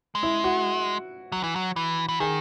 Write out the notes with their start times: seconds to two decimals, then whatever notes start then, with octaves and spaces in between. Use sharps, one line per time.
0.15 G#3
0.23 E4
0.44 F#4
1.32 F#3
1.44 E3
1.56 F#3
1.76 E3
2.09 E3
2.20 D#3 G#4